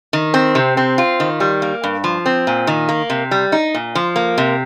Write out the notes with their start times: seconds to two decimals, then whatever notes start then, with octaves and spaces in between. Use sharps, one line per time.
0.13 D#3
0.34 C4
0.55 C3
0.77 C4
0.98 F4
1.20 D#3
1.40 G3
1.62 A#3
1.83 G2
2.04 F3
2.26 C4
2.47 A#2
2.67 D#3
2.89 A#3
3.10 C3
3.31 G3
3.52 D#4
3.74 A#2
3.95 F3
4.16 A#3
4.38 C3